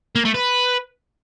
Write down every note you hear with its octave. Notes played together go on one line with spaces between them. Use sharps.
A#3
A3
B4